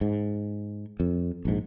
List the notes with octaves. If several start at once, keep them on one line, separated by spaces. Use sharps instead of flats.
G#2
F2
A#1 G#2